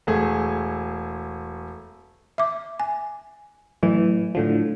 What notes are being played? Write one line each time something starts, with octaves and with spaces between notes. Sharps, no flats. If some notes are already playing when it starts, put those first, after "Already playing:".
E1 A3 G#4
E5 D6
G#5
A2 E3 F#3
A2 D3 F3